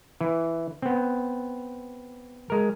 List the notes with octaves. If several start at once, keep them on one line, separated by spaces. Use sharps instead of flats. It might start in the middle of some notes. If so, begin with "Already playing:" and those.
E3
B3 C4
G#3 A#4